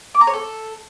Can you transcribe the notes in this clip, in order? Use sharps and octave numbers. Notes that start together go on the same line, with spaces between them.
D6
A#5
C#5
A4